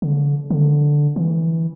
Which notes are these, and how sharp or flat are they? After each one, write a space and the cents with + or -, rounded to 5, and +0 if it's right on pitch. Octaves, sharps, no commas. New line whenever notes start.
D3 -35
D3 +0
E3 -10